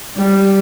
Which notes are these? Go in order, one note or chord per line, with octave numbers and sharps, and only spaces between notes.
G3